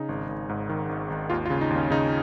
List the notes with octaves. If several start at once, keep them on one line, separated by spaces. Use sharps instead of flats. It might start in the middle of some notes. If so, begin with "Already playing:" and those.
Already playing: C#3 D#4
G#1
G#1
G#2
D#3
G#1
G#1
D#2 F4
F4
C#3
D#4
D#2
C#4
C#3 D#4